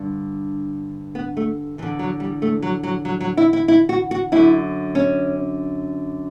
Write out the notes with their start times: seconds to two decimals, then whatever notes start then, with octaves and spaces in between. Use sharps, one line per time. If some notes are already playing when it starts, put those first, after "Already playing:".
Already playing: G2 D3
1.15 B3
1.37 A3
1.78 E2 E3
1.82 D3
1.99 F#3
2.20 G3
2.42 A3
2.62 F#3
2.83 F#3
3.05 F#3
3.21 F#3
3.37 E4
3.53 E4
3.68 E4
3.89 F#4
4.11 F#4
4.32 F#2 D3 E4
4.95 C#4